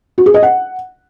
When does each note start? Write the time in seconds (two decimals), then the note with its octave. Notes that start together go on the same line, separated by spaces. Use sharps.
0.18 F#4
0.26 G#4
0.34 D#5
0.43 F#5